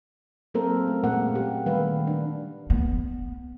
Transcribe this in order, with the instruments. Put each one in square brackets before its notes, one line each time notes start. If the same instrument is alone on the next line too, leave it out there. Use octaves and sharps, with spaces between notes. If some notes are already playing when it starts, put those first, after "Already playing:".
[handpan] F#3 A#3 C4 A4 A#4 C5
A3 C#4
A#2 G#3 A#3 A#4 F#5
G4
D#3 G3 A3 B4 F5
D4
[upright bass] B3